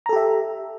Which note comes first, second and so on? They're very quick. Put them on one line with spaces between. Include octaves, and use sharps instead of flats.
A#5 A4 G4 E5